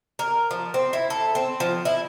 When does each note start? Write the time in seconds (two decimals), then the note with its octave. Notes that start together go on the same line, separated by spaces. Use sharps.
0.19 A#4
0.51 F3
0.74 C4
0.93 E4
1.10 A4
1.35 C4
1.60 F3
1.85 E4